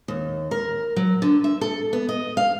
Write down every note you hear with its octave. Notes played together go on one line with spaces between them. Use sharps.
D#2
A#4
F#3
D3
E5
A4
B3
D#5
F5